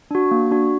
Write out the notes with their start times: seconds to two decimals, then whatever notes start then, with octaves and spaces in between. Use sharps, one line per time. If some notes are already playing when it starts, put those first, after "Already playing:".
0.11 D4 F#4
0.31 A#3
0.51 D4 F#4